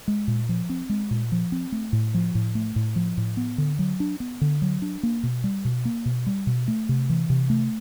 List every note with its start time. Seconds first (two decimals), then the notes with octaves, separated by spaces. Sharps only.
0.08 G#3
0.27 A#2
0.49 F3
0.69 C4
0.89 G#3
1.11 A#2
1.32 F3
1.52 C4
1.72 A3
1.93 A2
2.14 F3
2.35 A2
2.55 A3
2.76 A2
2.96 F3
3.17 A2
3.37 B3
3.58 D3
3.79 F#3
4.00 D4
4.20 B3
4.41 D3
4.62 F#3
4.82 D4
5.03 A#3
5.23 B2
5.44 G3
5.65 B2
5.85 A#3
6.05 B2
6.26 G3
6.47 B2
6.68 A3
6.89 C3
7.10 E3
7.30 C3
7.50 A3